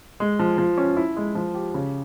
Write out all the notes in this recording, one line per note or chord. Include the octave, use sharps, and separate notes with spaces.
G#3
F3
F3
C#4
E4
G#3
F3
G4
C#3